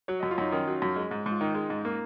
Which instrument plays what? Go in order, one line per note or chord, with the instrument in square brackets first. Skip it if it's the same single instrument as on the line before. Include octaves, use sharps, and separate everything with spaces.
[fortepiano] F#3 [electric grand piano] C#5
[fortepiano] F#2 [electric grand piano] D#5
[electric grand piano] F4
[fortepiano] F#2 [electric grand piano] D#4
[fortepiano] D#3 [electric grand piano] C#4
[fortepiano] F#3
F#2
G#3
G#2
G#2
[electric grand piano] F4
[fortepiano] D#3 [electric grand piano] D#4
[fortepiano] G#3
G#2
A#3